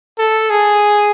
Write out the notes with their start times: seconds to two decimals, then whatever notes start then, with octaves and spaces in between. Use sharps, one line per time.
0.19 A4
0.50 G#4